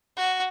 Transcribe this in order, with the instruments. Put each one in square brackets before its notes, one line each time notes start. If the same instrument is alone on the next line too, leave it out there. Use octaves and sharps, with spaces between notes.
[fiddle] F#4